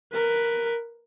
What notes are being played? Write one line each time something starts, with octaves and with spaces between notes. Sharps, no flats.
A#4 B4